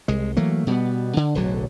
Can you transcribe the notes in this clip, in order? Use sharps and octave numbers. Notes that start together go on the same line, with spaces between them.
C2 G#3
E3 F#3 A3 A#3
B2 G3 B3
D3
D1 B1 D3 F#3